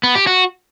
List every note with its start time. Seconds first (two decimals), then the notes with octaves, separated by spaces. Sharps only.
0.03 B3
0.15 G4
0.27 F#4